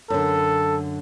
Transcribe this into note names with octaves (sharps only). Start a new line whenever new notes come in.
F#2 D3 A4